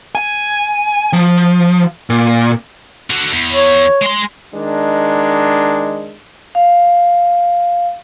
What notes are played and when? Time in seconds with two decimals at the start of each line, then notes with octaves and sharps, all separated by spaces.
0.15 G#5
1.13 F3
2.10 A#2
3.10 D3 F#4
3.32 E2
3.51 C#5
4.02 G#3 C6
4.54 D#3 G#3 D4
6.55 F5